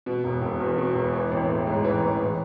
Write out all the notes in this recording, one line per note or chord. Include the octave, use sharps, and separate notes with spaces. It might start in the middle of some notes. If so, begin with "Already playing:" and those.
B2
E1
E1
E2
B2
E1
E3
A1
A3
G#2
E3
A1
E3